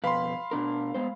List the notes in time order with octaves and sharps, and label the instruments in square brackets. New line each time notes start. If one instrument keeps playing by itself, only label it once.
[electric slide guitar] F2 B2 B4 [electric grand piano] F5 B5 C6
[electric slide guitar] B2 D4 A#4
G#3 B3 C5